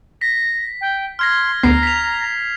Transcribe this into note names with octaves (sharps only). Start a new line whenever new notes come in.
A#6 B6
G5
C6 F6 G#6 A#6
D2 B3 A#5 C7
B6 F7